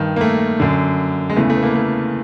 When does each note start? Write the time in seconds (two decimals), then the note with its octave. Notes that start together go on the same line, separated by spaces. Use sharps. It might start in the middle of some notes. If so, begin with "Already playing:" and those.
Already playing: G2 D#3
0.16 A#3
0.21 A3
0.60 F#2 D3
1.30 G#3
1.36 E2 C#3 E3 A3
1.50 A3
1.56 B3
1.63 A#3
1.75 A3